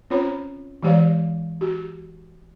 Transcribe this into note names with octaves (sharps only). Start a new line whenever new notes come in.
C4 C#4 F4 C5 C#5 B5
E3 G#3 G4 C5 D5 F5
F#4 G4